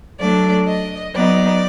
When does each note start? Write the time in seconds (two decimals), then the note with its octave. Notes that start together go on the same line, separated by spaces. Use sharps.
0.19 F#3 A3 D4 D5
0.67 D#5
1.15 F#3 B3 D#4 D5